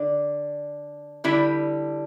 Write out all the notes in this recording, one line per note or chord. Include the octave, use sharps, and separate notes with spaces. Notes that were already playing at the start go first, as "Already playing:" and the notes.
Already playing: D3 D4 D5
D3 G3 E4 E5